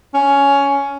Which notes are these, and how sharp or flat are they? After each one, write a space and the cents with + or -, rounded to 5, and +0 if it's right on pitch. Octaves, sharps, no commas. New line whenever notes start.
C#4 +10